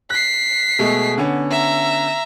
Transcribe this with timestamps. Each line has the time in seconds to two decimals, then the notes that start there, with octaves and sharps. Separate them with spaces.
0.10 F#6 B6 C7
0.79 B2 G#3 A3
1.18 D3 B3 C#4
1.51 E5 A#5